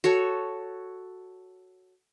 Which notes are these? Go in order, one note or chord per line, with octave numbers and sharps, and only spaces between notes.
F#4 A4 C#5